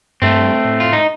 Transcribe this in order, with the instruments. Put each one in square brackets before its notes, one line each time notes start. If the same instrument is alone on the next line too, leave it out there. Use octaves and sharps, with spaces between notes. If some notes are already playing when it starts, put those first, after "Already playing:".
[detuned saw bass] G2 [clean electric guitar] A3 C4
[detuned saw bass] A2
[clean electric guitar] F4
D#4